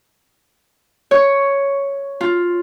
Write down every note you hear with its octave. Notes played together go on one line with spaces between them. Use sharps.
C#5
F4